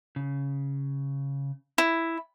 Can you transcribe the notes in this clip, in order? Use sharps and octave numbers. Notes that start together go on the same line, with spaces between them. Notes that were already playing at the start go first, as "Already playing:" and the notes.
C#3
E4